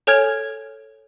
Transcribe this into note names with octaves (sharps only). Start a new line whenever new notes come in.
A4 C#5 G#5 F6 G#6 F7